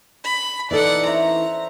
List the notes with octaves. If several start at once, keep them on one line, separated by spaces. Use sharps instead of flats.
B5
E3 D#4 A4 D5 F#5
C5 E5 A#5 C#6